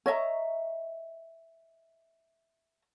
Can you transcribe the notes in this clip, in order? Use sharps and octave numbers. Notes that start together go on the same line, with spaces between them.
C#5 D#5 E5 A#5